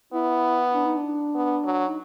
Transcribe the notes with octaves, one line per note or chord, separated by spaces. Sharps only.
B3 E4
D4
D#4
D4
B3
F#3
D#4